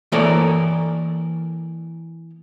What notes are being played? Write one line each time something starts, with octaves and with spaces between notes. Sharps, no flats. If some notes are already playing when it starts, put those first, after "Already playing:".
E3 A#3 A4 A#4 C#5 D5